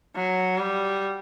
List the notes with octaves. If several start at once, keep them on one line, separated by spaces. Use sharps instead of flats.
F#3
G3